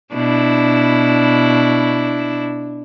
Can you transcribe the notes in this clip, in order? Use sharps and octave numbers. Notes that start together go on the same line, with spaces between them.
B2 D4 E4